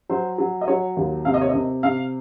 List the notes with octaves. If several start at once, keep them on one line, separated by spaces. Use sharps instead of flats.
F#3 C5
F#3
D#5
F#3 C#5
D#2
C3 F5
D#5
C#5
C3 D#5
C3 F5